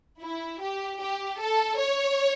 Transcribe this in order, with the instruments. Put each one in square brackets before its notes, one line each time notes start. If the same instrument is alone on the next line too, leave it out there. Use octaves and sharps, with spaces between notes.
[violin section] E4
G4
G4
A4
C#5